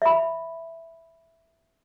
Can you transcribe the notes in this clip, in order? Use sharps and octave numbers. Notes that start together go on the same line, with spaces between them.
E5 B5